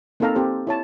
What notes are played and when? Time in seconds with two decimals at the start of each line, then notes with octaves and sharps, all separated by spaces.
0.20 A#3 C4 D#4 A4 F5 A#5
0.35 C4 G4 A4 C5
0.67 E4 C#5 A5